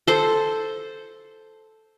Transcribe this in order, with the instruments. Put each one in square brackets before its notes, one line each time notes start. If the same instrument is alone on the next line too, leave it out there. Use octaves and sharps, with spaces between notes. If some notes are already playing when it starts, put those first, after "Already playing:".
[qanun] A4 C5